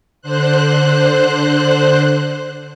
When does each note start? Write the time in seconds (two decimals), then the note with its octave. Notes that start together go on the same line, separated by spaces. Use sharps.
0.21 D3 C5 F#6